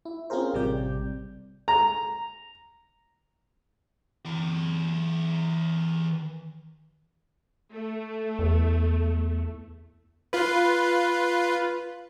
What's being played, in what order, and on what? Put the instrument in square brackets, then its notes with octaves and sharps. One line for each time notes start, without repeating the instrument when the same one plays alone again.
[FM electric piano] E4
C4 C#4 F4 G#4 A#4 C5
A1 C3 G3 C4 D5 G6
[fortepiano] A#5
[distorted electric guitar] E3 D5
[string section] A3
[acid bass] E2
[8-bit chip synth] F4 B4